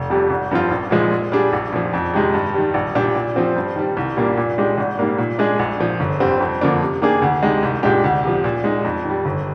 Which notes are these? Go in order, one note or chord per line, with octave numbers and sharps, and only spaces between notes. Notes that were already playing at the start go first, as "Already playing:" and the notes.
Already playing: F1
F2 C3 G3
G#1
G2 F3 C4 F4
A#1
A#2 F3 G#3
A#2
G3 D4 G#4
A#1
A#2 F3
F2
C3 D#3 G#3
G2
D#3 G3
A#1
A#2 G3 D4 G4
A#2
F3 C4
G2
D#3 G3
C2
A#2 G3 A#3 D4
A#2
G#3 D4 G4
G#1
G#2 G3 A#3
A#2
G#3 D4 G#4
A#1
A#2 F3
G1
F2 D3 G3 C4
F2
D3 F3 A#3 D4
C3
D#3 A#3 D4 G#4
D2
C3 D#3 G#3 D4
C2
A#2 G#3 D4 G4
D2
C3 F3
A#2
G#3 D#4
F2
D#3 G3
G1